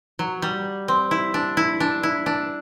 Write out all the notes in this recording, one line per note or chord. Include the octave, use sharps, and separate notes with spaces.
F#3
G3
C4
E4
D4
E4
D4
E4
D4